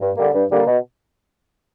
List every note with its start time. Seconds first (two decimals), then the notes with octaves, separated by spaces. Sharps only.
0.01 G2
0.17 D3 G3 A#3
0.34 G2
0.51 D3 G3 A#3
0.67 B2